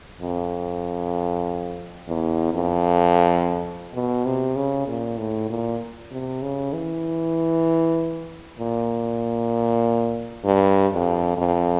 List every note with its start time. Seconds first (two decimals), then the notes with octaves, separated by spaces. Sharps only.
0.22 F2
2.08 E2
2.54 F2
3.94 B2
4.25 C3
4.56 C#3
4.88 A#2
5.18 A2
5.49 A#2
6.12 C3
6.42 C#3
6.73 E3
8.59 A#2
10.45 G2
10.92 F2
11.37 F2